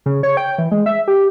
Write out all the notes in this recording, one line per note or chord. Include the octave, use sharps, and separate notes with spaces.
C#3
C#5
G5
E3
G#3
E5
G4